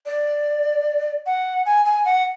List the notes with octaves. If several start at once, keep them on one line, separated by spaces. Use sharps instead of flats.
D5
F#5
G#5
G#5
F#5